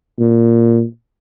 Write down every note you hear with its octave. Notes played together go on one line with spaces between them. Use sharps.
A#2